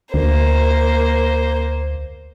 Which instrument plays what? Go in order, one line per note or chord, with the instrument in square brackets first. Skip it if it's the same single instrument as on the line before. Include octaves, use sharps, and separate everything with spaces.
[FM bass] D2 [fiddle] A#3 C5